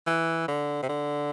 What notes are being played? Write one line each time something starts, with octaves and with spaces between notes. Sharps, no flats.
E3
D3
C3
D3